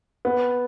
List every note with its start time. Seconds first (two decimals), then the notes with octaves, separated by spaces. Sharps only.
0.25 B3